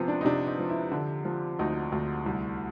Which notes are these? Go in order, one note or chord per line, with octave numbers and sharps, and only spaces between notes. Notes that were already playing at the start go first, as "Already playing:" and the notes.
Already playing: C3 F3 B3 C4
D4
D#4
C3 D4
D#4
F3
E4
D3
F3
D2 D#4
D2
C2